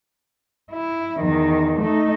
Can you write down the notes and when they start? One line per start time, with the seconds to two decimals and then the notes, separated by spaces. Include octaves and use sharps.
0.71 E4
1.20 E2 D#3
1.81 A3 D#4